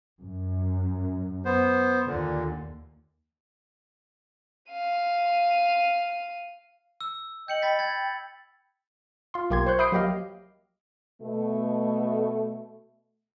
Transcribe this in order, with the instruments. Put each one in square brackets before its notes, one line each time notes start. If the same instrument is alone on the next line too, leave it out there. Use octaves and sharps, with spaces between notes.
[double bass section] F#2
[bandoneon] B3 C5
[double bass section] D#2 [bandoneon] A#2 D3
[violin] F5 D#7
[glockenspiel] E6
[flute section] D#5 G5 [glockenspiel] G6 C#7 F#7
[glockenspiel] B5 A6 B6
[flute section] G5 [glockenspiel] G#6 A6
[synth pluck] F4 C6
B1 A#3 G4 C6 G#6
C5 C6 C#6 F#6 G6
E5 B5 D#6 G6 C7 D7
F#3 A#3 G4 D#5 F5
[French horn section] B2 A3